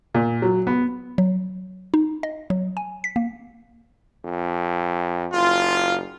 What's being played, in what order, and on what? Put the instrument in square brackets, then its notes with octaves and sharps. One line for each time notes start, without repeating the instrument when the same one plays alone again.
[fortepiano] A#2
F#3
B3
[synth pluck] F#3
D#4
D#5
F#3
G#5
B6
A#3
[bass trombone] F2
[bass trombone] F#1 [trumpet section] F4